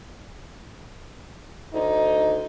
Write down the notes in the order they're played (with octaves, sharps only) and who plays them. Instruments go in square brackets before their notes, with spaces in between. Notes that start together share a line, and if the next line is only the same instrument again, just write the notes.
[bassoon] D2 [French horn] D#4